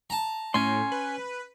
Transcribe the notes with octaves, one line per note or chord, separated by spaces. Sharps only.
A5 A#5
A2 C#4 G#5 C6
B4